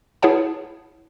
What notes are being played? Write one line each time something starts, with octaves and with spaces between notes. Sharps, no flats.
E4 G#4 B4 C#5 F#5 A5